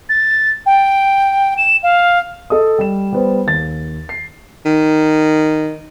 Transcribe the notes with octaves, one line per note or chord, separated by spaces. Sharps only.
A6
G5
E7
F5
A4 D#5 D#6
G3 E7
G3 B3 C5
D#2 A6
C7
D#3